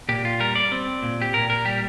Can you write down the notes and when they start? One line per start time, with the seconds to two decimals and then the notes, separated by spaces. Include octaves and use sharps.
0.09 A#2 G4
0.25 F4
0.40 G3 A#4
0.55 D5
0.72 C4
1.03 A#2
1.22 G4
1.34 A#2 A#4
1.50 A#4
1.65 G3 G4